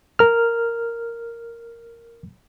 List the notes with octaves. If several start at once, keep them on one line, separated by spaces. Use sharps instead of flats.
A#4 F6